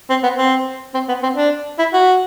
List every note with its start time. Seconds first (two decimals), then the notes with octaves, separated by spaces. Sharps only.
0.10 C4
0.23 B3
0.38 C4
0.94 C4
1.09 B3
1.23 C4
1.36 D4
1.79 E4
1.94 F#4